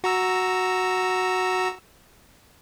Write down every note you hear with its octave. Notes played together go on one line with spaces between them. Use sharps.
F#4 A#5 E6